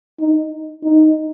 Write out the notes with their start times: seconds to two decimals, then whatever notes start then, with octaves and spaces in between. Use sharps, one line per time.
0.20 D#4
0.84 D#4